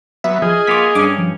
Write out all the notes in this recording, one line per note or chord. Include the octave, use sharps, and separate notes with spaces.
F#3 B3 E5
F3 G#4 D#5 F6
A#3 B3 F4 D6 B6
G2 C#4 D4 D6 D#6
F3